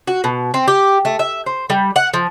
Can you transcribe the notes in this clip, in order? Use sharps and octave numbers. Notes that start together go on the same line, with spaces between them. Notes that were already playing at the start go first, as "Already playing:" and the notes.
F#4
B2
C4
G4
A3
E5
C5
G3
F#5
F3